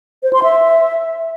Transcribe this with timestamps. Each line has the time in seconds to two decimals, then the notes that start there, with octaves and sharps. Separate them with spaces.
0.23 C5
0.33 C6
0.43 E5